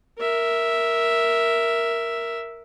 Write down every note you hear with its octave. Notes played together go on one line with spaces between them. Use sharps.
A#4 E5